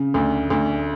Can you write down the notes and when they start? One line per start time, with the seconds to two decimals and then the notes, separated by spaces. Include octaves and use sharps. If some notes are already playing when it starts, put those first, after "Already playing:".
Already playing: C#3
0.14 D2
0.50 D2